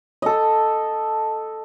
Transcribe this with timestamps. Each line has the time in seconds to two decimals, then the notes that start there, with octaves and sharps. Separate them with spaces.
0.22 A4 D#5